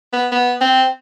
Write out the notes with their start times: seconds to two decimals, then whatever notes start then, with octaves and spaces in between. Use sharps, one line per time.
0.13 B3
0.32 B3
0.61 C4